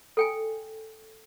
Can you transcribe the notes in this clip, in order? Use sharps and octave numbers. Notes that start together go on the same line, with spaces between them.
A4 G5 G#5